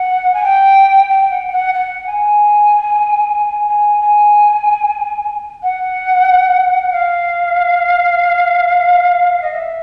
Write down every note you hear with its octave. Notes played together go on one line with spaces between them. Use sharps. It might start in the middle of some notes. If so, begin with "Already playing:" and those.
Already playing: F#5
G#5
G5
G5
F#5
G5
F#5
F#5
G#5
G#5
G#5
F#5
F5
D#5
E5